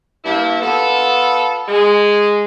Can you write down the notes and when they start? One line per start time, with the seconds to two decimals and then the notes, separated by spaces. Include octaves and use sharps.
0.24 G2 A#3 E4
0.61 B3 F4 A4
1.68 G#3